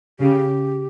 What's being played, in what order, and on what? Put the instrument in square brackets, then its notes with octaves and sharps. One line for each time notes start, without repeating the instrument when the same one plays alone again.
[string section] C#3 [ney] G4